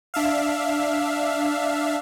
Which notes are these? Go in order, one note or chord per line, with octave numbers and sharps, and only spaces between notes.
D4 E5 F5